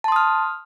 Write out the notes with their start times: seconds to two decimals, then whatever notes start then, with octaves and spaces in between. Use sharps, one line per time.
0.04 A5
0.08 C6
0.12 D#6
0.16 F6